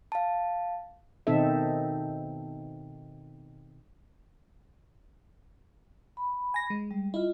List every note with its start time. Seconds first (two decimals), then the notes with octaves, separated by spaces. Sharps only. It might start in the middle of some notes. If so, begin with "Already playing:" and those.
0.12 F5 A5
1.27 B2 D#3 C4 D#4 A4 E5
6.17 B5
6.54 G#5 A#6
6.70 G#3
6.91 G3
7.14 E4 F4 D#5